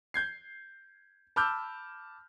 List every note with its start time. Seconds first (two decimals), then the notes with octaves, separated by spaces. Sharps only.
0.14 G6 G#6 C7
1.36 A5 B5 D6 E6 F6 G6